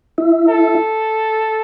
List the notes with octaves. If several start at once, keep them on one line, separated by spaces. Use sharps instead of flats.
E4
A4